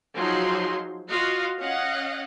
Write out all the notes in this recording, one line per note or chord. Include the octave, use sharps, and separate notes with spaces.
F3 F#3 D#4 G#4 C6
F4 F#4 D#5 F5
C#4 D#5 F5 F#5